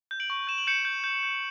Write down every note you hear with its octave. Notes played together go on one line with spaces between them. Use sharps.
G6
D7 F#7
C#6
G6 E7
F#7
G6 C#7 E7
G6
G6
G6